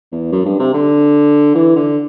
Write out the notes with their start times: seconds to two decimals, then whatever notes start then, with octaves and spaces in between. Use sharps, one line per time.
0.12 E2
0.32 F#2
0.45 G2
0.59 C3
0.74 D3
1.55 E3
1.76 D3